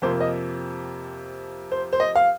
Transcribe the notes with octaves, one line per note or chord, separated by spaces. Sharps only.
F2 C3 F3 A#3 C5
D#5
C5
C5
D#5
F5